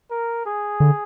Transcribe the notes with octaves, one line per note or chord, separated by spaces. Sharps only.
A#4
G#4
D3